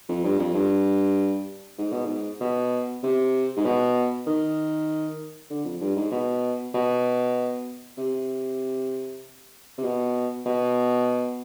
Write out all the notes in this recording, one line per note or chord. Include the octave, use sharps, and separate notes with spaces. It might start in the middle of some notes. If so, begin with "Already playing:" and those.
F2
G2
F2
G2
G#2
B2
G#2
B2
C3
G#2
B2
D#3
D3
F2
G2
G#2
B2
B2
C3
C3
B2
B2